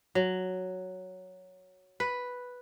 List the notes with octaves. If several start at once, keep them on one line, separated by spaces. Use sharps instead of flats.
F#3
B4